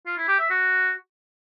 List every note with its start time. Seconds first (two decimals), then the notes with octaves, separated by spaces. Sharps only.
0.06 F4
0.17 E4
0.28 G4
0.39 E5
0.50 F#4